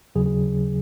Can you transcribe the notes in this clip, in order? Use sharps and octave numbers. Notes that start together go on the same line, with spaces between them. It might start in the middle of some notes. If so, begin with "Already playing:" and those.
D#2 C#3 F#3 G#4
G#4